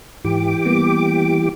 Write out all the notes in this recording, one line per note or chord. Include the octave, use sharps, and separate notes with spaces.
G#2 E3 G4 D6
G3 A#3 B3